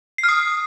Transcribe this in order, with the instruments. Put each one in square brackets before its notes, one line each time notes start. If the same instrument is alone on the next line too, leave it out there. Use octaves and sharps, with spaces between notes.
[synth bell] C7
F6
D#6